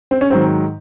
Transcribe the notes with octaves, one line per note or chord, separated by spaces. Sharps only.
C4
C#4
G#2 D#3 F#3 C4